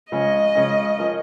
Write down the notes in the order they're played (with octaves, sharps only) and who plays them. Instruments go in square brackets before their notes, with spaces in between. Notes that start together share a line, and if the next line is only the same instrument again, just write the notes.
[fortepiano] C#3 F3 G#3 C#4 [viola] D#5
[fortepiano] C#3 F3 G#3 C#4
F3 C#4 A#4